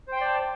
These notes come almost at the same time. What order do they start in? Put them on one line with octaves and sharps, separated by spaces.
C5 G5 C6 D5 A5